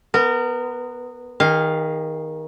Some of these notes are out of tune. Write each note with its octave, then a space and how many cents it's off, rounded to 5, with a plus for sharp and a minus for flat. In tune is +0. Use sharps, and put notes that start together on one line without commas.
B3 +0 A#4 -25
D#3 +15 G#4 -35 F5 +0